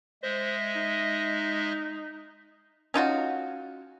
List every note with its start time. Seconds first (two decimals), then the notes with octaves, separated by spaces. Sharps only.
0.23 G#3 C5 D#5 E5
0.75 D#4
2.94 C#4 D#4 F4 F#4